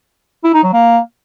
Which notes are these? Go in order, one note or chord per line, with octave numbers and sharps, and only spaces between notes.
E4
D#4
F#3
A#3